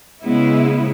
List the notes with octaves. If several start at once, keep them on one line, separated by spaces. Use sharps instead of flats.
C#3 G#3 B3 E4